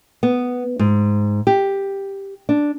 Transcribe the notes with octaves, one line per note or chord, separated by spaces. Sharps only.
B3
G#2
G4
D4